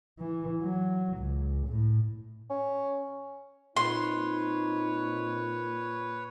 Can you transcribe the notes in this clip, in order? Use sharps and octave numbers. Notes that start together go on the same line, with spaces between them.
E3
F#3
C#2
A2
C#4
A#2 C4 D#4 B4 C#5 C6